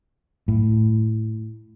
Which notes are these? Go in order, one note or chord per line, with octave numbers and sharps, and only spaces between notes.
A2